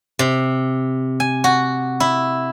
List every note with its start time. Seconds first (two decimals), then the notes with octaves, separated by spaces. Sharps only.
0.19 C3
1.20 G#5
1.44 F#4
2.00 E4